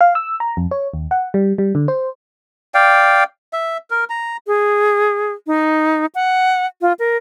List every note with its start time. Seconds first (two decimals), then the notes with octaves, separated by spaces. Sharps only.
0.01 F5
0.15 E6
0.40 A#5
0.57 F2
0.71 C#5
0.94 D#2
1.11 F#5
1.34 G3
1.58 G3
1.75 D3
1.88 C5
2.74 D5 F5 G5
3.53 E5
3.90 A#4
4.10 A#5
4.47 G#4
5.47 D#4
6.15 F#5
6.81 F4
6.99 A#4